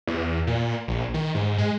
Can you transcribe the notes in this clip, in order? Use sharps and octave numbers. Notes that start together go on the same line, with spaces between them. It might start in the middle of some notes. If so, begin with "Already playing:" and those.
E2
A#2
A#1
D#3
G#2
G#3